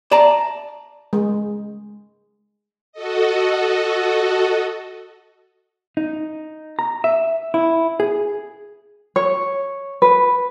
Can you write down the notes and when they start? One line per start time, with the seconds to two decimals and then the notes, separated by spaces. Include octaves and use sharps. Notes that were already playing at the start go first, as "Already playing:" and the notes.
0.11 D5 A5 A#5
1.13 G#3
2.93 F#4 A4 D#5
5.97 D#4
6.79 A#5
7.04 E5
7.54 E4
8.00 G#4
9.16 C#5
10.02 B4